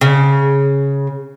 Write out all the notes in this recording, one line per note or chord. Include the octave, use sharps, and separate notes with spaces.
C#3